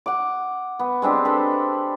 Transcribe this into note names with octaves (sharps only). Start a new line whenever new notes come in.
F#5 D6
B3
G#3 C4 D4 G4
A4 B4 C5